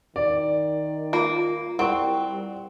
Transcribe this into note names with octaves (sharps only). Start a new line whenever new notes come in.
D#3 D5
A#3 F4
G3 C4 E4 A#4 F#5 C#6